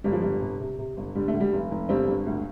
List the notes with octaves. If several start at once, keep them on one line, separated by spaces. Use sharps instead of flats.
G1 G3
F3
G1 G3
C3
C3
C3
G1
D3 G3
A3
D2
G3
F1
F1
G1 G3 C4
G2
D2